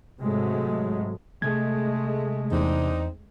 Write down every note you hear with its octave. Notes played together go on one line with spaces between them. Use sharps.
G#2 C3 F#3 G#3 A3
C3 G#3 A3 G#6
E2 C4 D4 D#4